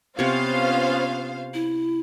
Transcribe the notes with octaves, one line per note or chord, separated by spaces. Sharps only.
C3 B3 C#4 F4 C5 C#5 F5
E4